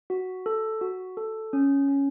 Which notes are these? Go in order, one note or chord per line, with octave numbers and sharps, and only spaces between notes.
F#4
A4
F#4
A4
C#4
C#4